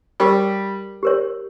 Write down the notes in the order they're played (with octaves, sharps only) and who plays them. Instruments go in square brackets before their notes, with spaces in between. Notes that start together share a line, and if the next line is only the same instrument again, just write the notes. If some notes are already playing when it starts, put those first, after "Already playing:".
[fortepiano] G3 [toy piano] G4 A#4 C#5
[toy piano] G4 A#4 C#5